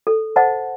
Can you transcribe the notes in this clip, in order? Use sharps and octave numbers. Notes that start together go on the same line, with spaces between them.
A4
C5 D#5 F#5 A5